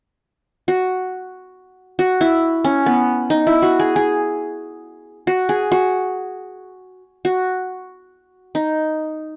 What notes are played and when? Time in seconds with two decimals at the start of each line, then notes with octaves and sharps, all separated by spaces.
0.68 F#4
1.99 F#4
2.21 E4
2.64 C#4
2.86 B3
3.30 D#4
3.47 E4
3.62 F#4
3.80 G#4
3.96 G#4
5.27 F#4
5.49 G#4
5.72 F#4
7.25 F#4
8.55 D#4